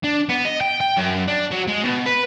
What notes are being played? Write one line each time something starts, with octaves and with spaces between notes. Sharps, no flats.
D4
B3
D#5
G5
G5
F#2
D4
F#3
G#3
B2
B4